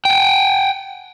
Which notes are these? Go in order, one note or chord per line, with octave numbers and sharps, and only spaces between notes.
F#5 G5